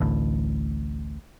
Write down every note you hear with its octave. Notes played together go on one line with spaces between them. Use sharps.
A1 D2 A2